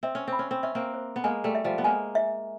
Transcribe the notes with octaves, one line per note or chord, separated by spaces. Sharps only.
C4 E5
C#4
C4
B5
C#4
C4
C#4 E5
A#3 C4
C5
B3
G#3 A#3 G#5
G3 A3
E5
F3 G3
B3
G#3 A#3 G#5
E5